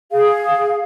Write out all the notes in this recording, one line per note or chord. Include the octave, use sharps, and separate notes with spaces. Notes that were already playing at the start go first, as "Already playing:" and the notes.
G#4 F5